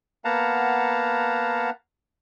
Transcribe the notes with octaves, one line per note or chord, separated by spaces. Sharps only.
A#3 B3 F5 F#5 A5 A#5